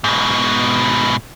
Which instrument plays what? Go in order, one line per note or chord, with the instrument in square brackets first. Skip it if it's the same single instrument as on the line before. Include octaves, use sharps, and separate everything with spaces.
[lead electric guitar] G#2 B2